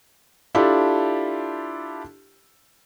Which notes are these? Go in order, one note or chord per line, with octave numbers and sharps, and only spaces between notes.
D4 E4 F4 G4 A4